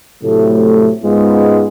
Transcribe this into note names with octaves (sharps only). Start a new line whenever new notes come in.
A2 C3 F#3 A3
G#2 G#3 B3 C#4 F4